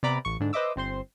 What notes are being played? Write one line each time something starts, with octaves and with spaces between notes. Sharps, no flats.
C3 B3 D5 A#5 B5 D6
A1 C#6
G#2 D3 D4
B4 C5 D#5 E5 D6 E6
G1 C4 C5 C6